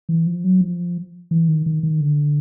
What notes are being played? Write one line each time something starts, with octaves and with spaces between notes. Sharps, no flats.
E3
F3
F#3
F3
E3
D#3
D#3
D#3
D3